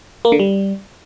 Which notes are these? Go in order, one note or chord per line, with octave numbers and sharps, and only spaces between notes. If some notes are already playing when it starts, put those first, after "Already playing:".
A#3
D3
G3